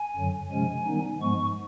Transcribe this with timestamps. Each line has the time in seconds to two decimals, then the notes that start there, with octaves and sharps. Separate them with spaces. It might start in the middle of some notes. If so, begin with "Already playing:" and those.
Already playing: G#5
0.16 F#2 D3 F#3
0.51 C3 F3 G#3 C#4 G#5
0.86 D#3 G3 B3 D#4
1.21 G#2 F3 G#3 B3 C#6